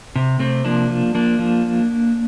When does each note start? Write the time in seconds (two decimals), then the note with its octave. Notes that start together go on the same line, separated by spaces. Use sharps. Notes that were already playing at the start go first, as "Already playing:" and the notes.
0.16 C3
0.39 C3 A3 C4
0.65 F3 A#3 D4
0.90 F3
1.15 F3 A#3 D4
1.39 F3